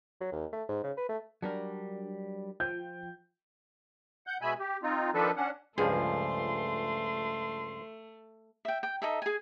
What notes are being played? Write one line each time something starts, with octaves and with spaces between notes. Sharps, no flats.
F#3
D#2
A3
G#2
C#3
B4
A3
F#3 G3 D4 A#4
F3 F4 G5 G6
F#5 G6
B2 G#3 E5 G#5 B5
G4
C4 D#4 F4
D#3 F3 D4 A4 B4
C#4 D4 F#5
C#2 G2 F3 A3 G#4 C6
E5 G5
G5
D#4 A4 E5
G#4 G#5